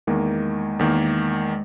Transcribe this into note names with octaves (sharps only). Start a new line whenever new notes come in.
E2 D#3 G#3 A#3
E2 D#3 A#3